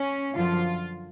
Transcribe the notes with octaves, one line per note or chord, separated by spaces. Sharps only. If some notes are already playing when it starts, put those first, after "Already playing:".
Already playing: C#4
F#2 D3 F3 F4